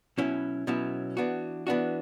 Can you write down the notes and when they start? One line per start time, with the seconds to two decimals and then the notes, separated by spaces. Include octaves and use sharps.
0.18 B2 F#3 C#4 E4
0.67 B2 F#3 C#4 E4
1.17 E3 B3 D4 F#4
1.67 E3 B3 D4 F#4